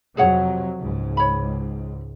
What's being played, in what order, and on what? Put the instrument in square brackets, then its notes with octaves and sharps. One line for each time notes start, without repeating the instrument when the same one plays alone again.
[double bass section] F2 C3 F#3 [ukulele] G#4 C#5 F#5
[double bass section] C#2 G#2
[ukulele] C#5 B5